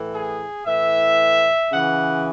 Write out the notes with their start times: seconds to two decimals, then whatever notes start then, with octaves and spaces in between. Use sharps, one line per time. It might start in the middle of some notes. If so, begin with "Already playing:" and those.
Already playing: A2 E3
0.13 G#4
0.65 A2 E3 E5
1.71 C#3 E3 F#5